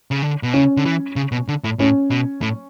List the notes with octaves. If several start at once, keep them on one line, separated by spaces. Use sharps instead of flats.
C#3
D3
B2
C#3 C#4
D3
E3
C#3
B2
D3
A2
A2 C#4
B2
A2